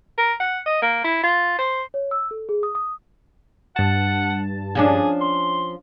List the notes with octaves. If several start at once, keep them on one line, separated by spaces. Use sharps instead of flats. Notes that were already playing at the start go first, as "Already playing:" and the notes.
A#4
F#5
D#5
A#3
E4
F4
C5
C#5
E6
A4
G#4
D#6
D#6
G2 F#5 A5
F3 C#4 D4 G#4
C6